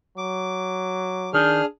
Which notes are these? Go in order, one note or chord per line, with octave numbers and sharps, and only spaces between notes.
F#3 D6
D#3 D4 G#4 F6